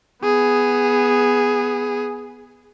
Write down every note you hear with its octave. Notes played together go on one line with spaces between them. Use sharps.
B3 G#4